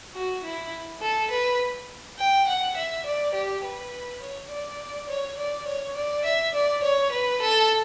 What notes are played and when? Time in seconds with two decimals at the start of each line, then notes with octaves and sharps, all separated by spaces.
0.14 F#4
0.44 E4
1.01 A4
1.30 B4
2.18 G5
2.47 F#5
2.76 E5
3.06 D5
3.34 G4
3.64 B4
4.21 C#5
4.50 D5
5.08 C#5
5.37 D5
5.67 C#5
5.95 D5
6.25 E5
6.54 D5
6.83 C#5
7.11 B4
7.41 A4